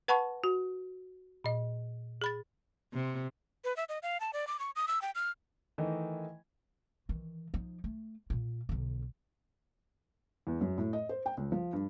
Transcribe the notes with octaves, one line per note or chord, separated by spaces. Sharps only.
B4 F#5 A5 B5 C#6
F#4
A#2 D#5
G#4 B5 A6
C3
B4
E5
D#5
F5
A5
D5
D6
C#6
D#6
E6
G5
F6
D#3 E3 A3 D#4 D#5
D#3 E3
F3 D#4
A3
A#2 F4
B1 D3
E2
F#2
A2
D#5
C5
G5
C#2
F3
G2